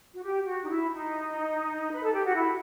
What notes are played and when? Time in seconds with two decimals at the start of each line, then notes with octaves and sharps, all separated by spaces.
0.15 F#4
0.22 G4
0.45 F#4
0.63 D#4
0.70 E4
0.93 D#4
1.92 B4
2.03 A4
2.14 G4
2.25 F#4
2.36 E4